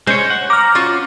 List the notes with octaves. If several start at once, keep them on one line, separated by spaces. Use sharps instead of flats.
G#3 C#4 C5 C#5
F#5
A#5 D6 F6
C#4 F4 F#4